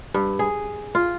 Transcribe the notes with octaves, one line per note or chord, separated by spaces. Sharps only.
G2
G#4
F4